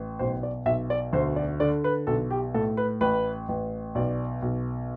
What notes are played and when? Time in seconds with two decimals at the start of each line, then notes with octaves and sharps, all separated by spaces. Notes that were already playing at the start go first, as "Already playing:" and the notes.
Already playing: A1
0.19 B1 C5
0.43 D5
0.66 B1 E5
0.90 D5
1.13 D2 C5
1.36 D5
1.60 D3 D5
1.84 B4
2.07 B1 A4
2.31 G4
2.54 A2 A4
2.77 B4
3.01 A1 B4
3.49 A1
3.95 B1 D5
4.42 B1